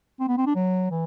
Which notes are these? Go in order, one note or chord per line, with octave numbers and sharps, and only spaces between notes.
C4
B3
C4
D4
F#3
E3